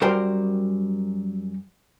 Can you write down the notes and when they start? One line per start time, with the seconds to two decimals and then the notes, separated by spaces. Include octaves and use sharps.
0.01 F#2 G3 F#4 A#4 C5 G5